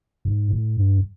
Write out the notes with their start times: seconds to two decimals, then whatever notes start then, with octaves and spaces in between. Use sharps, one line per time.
0.25 G#2
0.50 A2
0.77 G2